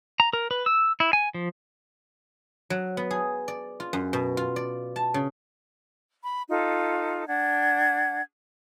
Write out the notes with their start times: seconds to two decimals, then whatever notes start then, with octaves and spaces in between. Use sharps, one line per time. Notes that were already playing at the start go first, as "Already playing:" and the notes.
0.20 A#5
0.33 A#4
0.51 B4
0.66 E6
1.00 E4
1.13 G#5
1.34 F3
2.70 F#3
2.97 B3
3.11 G#4
3.48 D5
3.80 F4
3.93 F#2
4.13 B2
4.37 F4
4.56 D5
4.96 A5
5.14 C#3
6.22 B5
6.49 D#4 F4 A4
7.28 D4 F#5 G#6